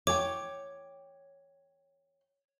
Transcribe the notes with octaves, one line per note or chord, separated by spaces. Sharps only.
C#5 G5 D6